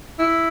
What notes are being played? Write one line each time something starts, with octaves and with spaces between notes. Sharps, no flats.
E4